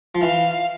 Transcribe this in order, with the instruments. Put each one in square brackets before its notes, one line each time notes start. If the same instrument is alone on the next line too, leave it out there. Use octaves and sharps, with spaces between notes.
[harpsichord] F3
[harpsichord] E3 [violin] F5